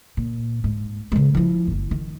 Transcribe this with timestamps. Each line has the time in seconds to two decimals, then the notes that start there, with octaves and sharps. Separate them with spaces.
0.17 A#2
0.64 G#2
1.12 C#3 G#3
1.35 F3 E4
1.67 F#1 F2
1.91 D#3